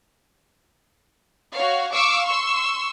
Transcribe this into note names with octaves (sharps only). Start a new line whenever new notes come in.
F#4 C#5 F5
F5 C#6 D6 E6
C6 C#6 E6